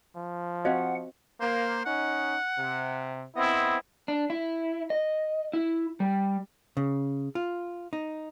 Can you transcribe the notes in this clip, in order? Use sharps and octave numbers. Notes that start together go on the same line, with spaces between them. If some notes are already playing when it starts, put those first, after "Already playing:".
F3
C4 F#4 C5 D#5 F5 F#5
A#3 C5
C#4 D#4 F#5
C3
B3 C4 E4 D#5
D4
E4
D#5
E4
G3
C#3
F4
D#4